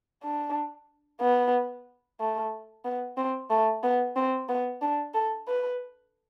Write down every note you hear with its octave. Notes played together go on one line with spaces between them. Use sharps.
D4
B3
A3
B3
C4
A3
B3
C4
B3
D4
A4
B4